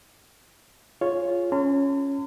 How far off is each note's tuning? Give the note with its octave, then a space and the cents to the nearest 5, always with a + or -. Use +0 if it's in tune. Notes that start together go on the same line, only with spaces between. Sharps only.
F4 +0 G#4 +0 C#5 +0
C#4 +0 A5 +45 C6 -45